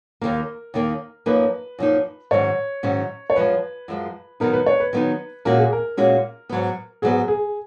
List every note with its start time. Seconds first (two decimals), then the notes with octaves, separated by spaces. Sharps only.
0.21 D#2 D#3 A#3 A#4
0.74 D#2 D#3 A#3
1.26 F#2 F3 A#3 D#4 B4
1.79 F#2 F3 A#3 D#4
2.31 G#2 D#3 F#3 C#4 C#5
2.83 G#2 D#3 F#3 C#4
3.30 C#5
3.36 F#2 F3 G#3 B4
3.88 F#2 F3 G#3
4.40 D#3 F#3 B3 D#4 A#4
4.53 B4
4.66 C#5
4.80 B4
4.93 D#3 F#3 B3 D#4
5.45 A#2 G#3 C#4 F#4 A#4
5.59 G#4
5.73 A#4
5.97 A#2 G#3 C#4 F#4
6.49 G#2 F#3 B3
7.02 G#2 F#3 B3 G#4
7.28 G#4